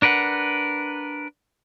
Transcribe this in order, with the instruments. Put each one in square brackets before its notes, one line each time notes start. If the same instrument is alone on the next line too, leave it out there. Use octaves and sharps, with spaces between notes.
[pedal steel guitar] D4 A#4 B4 F#5